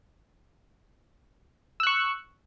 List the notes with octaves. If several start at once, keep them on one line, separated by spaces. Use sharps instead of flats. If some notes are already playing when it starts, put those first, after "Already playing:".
C#6 E6 F#6